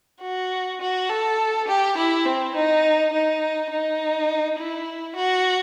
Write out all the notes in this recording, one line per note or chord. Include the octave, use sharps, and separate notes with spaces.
F#4
F#4
A4
G4
E4
C4
D#4
D#4
D#4
E4
F#4